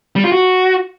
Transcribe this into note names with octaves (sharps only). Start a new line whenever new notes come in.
G3
F4
F#4